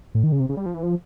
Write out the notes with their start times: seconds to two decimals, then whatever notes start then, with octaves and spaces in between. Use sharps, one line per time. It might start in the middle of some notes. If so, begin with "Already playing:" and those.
0.15 A2
0.24 D#3
0.32 C#3
0.40 C3
0.49 C#3
0.57 G3
0.66 F3
0.74 E3
0.83 F3